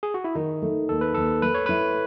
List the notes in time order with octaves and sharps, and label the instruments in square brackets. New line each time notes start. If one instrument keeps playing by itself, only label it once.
[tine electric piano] G#4
F#4
E4
[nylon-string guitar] D#3 [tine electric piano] D#4
[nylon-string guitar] A3
[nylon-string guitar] D#2 [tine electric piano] A4
[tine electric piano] B4
[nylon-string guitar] D#2 [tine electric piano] A4
[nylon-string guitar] A3 [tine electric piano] B4
[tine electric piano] C#5
[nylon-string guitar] E4 [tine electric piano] B4